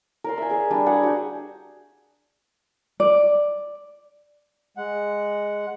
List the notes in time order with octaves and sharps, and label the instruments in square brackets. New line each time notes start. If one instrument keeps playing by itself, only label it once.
[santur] A#4 D5 C6
E5 G#5
G#4 E5
G3 D4
D4 F#4 G#4 F#5
F#4 G5
[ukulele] D5
[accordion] G#3 F#5